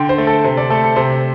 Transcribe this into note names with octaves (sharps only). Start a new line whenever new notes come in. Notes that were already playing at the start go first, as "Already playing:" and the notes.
Already playing: D3 G5 C6
C5
A3
A4
C3 C5
A4 D5
A3 A4
A4
C3 C5